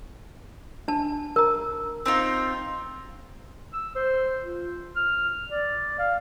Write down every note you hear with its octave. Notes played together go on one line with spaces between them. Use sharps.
D4 A5
A#4 A#5
C4 D#4 F4
E6
C5
F4
F6
D5
F5